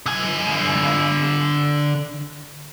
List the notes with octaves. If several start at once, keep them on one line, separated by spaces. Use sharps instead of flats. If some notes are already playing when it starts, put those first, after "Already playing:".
D3 G#5